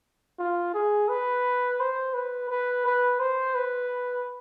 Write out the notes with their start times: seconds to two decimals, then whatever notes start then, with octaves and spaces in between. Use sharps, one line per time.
0.39 F4
0.74 G#4
1.09 B4
1.80 C5
2.14 B4
2.50 B4
2.85 B4
3.19 C5
3.55 B4